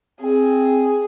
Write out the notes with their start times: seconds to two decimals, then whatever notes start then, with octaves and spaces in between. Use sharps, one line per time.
0.21 C4 G#4